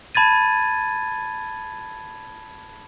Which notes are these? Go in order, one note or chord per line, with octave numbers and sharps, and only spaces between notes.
A5 B5 G#6 A6 D#7